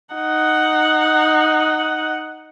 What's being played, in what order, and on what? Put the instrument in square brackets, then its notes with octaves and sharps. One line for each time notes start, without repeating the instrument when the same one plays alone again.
[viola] D#4 F#5